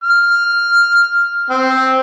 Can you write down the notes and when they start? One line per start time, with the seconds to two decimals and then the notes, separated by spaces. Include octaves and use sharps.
0.04 F6
1.50 C4